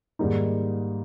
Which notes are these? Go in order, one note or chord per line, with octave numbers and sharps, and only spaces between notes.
G#2 D#3 G3 A#3 D#4